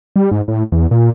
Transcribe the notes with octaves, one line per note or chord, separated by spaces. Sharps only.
G3
G#2
A2
E2
A#2